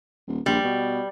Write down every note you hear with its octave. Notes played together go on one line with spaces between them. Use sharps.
D#1
A#1 G3
B2